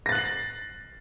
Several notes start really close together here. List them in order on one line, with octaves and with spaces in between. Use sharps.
A#6 A6 F#6 F#7 C7